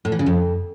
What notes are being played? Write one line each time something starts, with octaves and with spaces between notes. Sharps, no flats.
A2
E3
C#3
F2